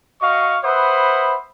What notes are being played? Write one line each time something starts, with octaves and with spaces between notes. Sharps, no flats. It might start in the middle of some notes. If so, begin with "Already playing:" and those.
F#4 D#5 F5 C#6
B4 C5 E5 F#5 B5 D#6